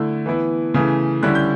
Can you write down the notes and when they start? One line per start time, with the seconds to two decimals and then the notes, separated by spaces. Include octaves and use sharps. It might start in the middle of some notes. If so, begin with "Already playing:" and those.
Already playing: D3 A3 E4
0.26 E3 B3 E4
0.74 C#3 E3 A3
1.22 D3 G3 C#4 E4 F#6
1.35 G6